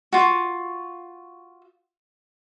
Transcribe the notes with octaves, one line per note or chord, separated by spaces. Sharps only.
F4 F#4